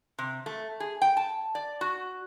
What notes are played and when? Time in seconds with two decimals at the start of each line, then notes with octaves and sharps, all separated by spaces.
0.18 C3
0.46 A3
0.80 G#4
1.02 G5
1.17 A5
1.55 D5
1.81 F#4